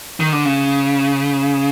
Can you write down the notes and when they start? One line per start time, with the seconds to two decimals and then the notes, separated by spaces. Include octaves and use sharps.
0.20 D#3
0.32 D3
0.45 C#3